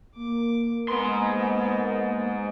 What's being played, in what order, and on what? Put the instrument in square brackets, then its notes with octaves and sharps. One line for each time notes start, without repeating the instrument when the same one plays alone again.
[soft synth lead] A#3 [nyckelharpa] D6
[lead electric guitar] G#2 C6 [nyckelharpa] B3